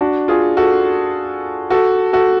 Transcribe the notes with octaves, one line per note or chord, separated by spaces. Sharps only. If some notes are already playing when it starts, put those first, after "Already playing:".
D4 F#4
F4 G#4
F#4 A4
F#4 A4
F#4 A4